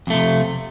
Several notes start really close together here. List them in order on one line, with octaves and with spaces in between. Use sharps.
F2 A3 C3